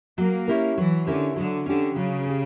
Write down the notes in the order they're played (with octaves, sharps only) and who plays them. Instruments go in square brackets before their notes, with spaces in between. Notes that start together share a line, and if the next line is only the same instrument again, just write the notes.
[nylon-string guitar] F#3 [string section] A#3
[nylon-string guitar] C#4 E4 G4 A#4
[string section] E3 [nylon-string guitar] F#3
[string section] D3 [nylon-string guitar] C#4 E4 G4 A#4
[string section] D3 [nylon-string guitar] F#3
[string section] D3 [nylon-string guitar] C#4 G4
[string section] C#3 [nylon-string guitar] F#3
[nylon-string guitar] C#4 G4